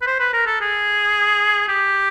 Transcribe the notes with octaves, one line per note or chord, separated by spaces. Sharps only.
B4
C5
B4
A#4
A4
G#4
G4